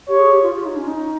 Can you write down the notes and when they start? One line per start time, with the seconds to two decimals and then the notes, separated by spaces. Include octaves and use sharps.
0.09 G4 C#5
0.20 G#4
0.31 G4
0.43 F4
0.55 F4
0.66 D#4
0.76 C#4
0.87 D#4